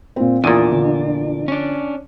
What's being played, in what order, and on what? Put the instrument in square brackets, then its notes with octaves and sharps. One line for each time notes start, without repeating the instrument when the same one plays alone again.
[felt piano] A#2 C4
[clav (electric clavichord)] E2 A#2 [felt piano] F3 D#6 D#7 [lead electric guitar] D4
[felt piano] D3 F3
[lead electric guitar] C#4 D4